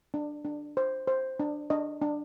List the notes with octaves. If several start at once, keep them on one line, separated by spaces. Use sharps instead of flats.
D4
D4
C5
C5
D4
D4 D#5
D4